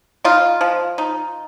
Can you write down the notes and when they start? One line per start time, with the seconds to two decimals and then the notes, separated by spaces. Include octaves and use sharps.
0.24 D#4 F4
0.61 F3
0.98 D#4